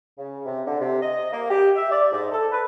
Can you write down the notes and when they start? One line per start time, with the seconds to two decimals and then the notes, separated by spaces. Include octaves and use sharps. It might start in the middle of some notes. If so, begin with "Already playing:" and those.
0.18 C#3
0.46 C3
0.66 D3
0.79 C3
1.02 D#5
1.32 A#3
1.49 G4
1.76 E5
1.91 D5
2.11 G#2
2.32 A4
2.51 B4